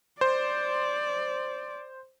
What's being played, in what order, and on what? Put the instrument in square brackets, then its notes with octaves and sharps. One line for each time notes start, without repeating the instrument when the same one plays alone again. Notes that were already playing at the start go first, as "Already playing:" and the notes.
[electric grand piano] C5 [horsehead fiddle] D5